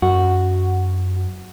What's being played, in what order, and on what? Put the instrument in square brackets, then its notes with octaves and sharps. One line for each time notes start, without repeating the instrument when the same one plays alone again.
[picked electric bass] F#2 [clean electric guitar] F#4